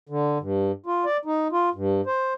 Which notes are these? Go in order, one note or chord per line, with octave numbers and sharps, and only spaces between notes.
D3
G2
F4
D5
D#4
F4
G2
C5